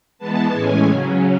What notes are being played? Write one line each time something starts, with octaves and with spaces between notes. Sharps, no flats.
E3 G#3 B3 A5
A2 E3 G#3 C#4 G#5
C#3 F#3 C#4